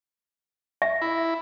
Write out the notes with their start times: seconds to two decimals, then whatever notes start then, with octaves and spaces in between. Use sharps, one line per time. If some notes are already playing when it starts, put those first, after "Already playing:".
0.82 E5
1.02 E4